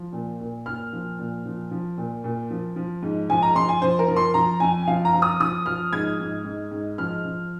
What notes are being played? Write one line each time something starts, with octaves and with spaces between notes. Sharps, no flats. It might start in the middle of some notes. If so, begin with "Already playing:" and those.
Already playing: F3
A#2
A#2
A#2 F6
F3
A#2
F3
F3
A#2
A#2
F3
F3
G#2
F3 G#5
A#5
F3 C6
G#5
F3 C5
A#4
F3
C6
F3 A#5
F2 G#5
F3 F5
A#5
F3
D#6
F3 D#6
F3 F6
G#2 G#6
G#2
G#2
G#2
F3 F6
F3